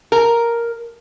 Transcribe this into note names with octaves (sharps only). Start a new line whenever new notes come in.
A#4